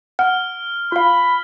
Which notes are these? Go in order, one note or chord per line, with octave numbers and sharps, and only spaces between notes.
F#5 F6
F4 F5 B5